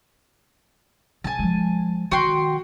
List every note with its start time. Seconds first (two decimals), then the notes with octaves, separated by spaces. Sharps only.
1.24 C#3 G#5 A5
1.39 F3 G#3
2.11 D#3 F#4 G5 C6